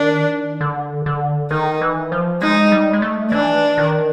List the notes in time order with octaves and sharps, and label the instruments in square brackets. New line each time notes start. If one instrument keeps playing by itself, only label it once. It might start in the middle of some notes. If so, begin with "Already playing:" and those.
Already playing: [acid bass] D#3 [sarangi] D4
[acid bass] D3
D3
[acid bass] D#3 [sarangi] D#4
[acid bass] E3
F3
[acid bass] G#3 [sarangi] D#4
[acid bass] G3
G#3
A3
[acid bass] E3 [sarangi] D4
[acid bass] D#3